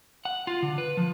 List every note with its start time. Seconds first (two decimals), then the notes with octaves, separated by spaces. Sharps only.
0.25 F#5
0.47 F4
0.63 D3
0.78 B4
0.97 F3